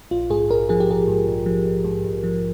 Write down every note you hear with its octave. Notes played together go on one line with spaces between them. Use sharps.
A#1 F4
G#2 G#4
A#1 A#4
F3 G#4
G4
A#1 G#4
G#2
A#1
F3
A#1
G#2
A#1
F3